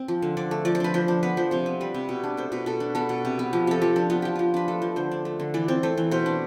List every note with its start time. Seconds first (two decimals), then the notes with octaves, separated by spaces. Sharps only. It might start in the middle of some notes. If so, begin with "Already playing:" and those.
Already playing: C4
0.08 F3
0.22 D3
0.37 D3 D5
0.51 A3
0.65 F3 D5
0.75 C5
0.80 D4 B4
0.94 F3 C5
1.08 D4
1.23 B3 B4
1.37 F3 C5
1.51 C3 C5
1.66 B3
1.80 G3 B4
1.94 C3
2.09 B2
2.24 D4
2.37 A3 C5
2.52 B2 B4
2.66 B2 A4
2.80 D4
2.95 B3 A4
3.09 B2
3.25 C3
3.39 B3
3.53 F3
3.67 C3 A4
3.82 F3 G4
3.96 D4
4.10 B3 F4
4.22 F3 G4
4.36 F3 F4
4.54 D4 B4
4.68 A3 A4
4.82 F3
4.96 D3 C5
5.12 D4
5.25 A3
5.40 D3
5.54 E3 D5
5.68 C4 C5
5.83 A3 C5
5.98 E3
6.11 B2 C5
6.26 D4